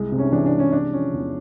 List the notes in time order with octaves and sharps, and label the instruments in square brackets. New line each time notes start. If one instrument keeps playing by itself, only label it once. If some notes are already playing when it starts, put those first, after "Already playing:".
Already playing: [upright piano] C2 G#3
C3
C#4
E3 D4
D4
G#3
C#4
C3 D4
F3 C#4
E2